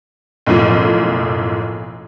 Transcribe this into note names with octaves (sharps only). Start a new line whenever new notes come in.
F#1 B1 A2 F3